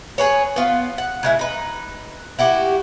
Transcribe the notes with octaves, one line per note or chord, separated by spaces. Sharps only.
G#4 B4 C#5
B3 F4
F#5
C#3 G#3 E4
D#4 B4
E4 F#4 G4